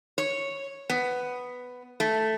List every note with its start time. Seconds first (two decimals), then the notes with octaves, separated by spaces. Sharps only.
0.18 C#5
0.90 B3
2.00 A3